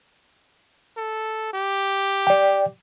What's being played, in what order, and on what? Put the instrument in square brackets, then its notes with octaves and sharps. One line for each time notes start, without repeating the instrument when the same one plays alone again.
[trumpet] A4
G4
[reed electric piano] D5 G5